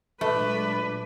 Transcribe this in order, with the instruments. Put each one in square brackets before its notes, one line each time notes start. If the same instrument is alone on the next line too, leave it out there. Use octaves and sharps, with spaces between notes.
[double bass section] A#2 F#3 G#3 [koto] A3 [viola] D4 B4